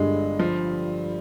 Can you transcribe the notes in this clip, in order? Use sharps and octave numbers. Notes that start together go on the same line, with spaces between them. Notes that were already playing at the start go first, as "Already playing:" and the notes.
Already playing: G1 G2 D3 G3 G#3
F3